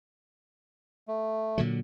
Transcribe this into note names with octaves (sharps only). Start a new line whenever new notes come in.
A3
A#2 D3 F#3